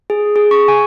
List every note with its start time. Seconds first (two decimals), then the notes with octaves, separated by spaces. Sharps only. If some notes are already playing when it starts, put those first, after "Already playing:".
0.10 G#4
0.36 G#4
0.51 C#6
0.68 G#5